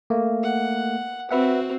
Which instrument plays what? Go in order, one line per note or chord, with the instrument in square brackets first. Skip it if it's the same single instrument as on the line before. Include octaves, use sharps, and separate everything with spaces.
[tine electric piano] A3 A#3
[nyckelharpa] F#5
[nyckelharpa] C4 F#4 [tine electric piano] B4 E5 F#5